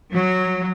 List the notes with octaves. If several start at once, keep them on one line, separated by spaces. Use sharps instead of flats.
F#3